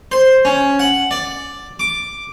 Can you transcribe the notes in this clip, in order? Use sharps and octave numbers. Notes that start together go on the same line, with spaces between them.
C5
C#4
F#5
D5
D6